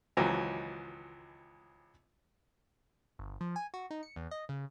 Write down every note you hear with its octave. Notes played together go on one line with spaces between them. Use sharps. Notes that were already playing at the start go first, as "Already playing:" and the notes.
G#1 C#2 E3 F#3 G5 A#5
G1
F3
G#5
F#4
D#4
C#7
E2
D#5
C#3